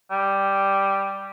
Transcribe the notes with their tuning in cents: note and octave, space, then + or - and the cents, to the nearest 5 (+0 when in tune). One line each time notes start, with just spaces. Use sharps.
G3 +0